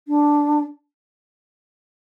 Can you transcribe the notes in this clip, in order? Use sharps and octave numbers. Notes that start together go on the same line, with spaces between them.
D4